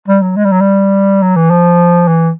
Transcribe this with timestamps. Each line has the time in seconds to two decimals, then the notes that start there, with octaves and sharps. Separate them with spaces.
0.08 G3
0.22 F#3
0.36 G#3
0.45 G3
0.52 F#3
0.61 G3
1.22 F#3
1.36 E3
1.50 F3
2.07 E3